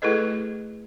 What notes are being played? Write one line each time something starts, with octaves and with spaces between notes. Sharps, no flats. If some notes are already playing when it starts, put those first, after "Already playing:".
A3 E4 G#4 A4 B4 D#5